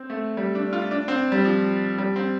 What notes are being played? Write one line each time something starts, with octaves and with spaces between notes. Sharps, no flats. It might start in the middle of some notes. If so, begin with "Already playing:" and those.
Already playing: C4
A3
G3
D4
F4
D4
C4
G3
F3
G3
C4